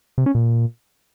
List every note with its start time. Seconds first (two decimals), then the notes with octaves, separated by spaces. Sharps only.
0.18 C3
0.26 C#4
0.35 A#2